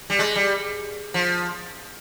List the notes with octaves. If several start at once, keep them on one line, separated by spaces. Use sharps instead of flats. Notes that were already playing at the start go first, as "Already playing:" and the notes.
G3
G#3
G3
F3